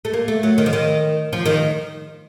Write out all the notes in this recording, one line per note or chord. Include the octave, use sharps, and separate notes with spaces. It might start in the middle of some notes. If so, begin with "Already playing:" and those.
A3
A#3
A3
F#3
D#3
F3
D#3
F3
D#3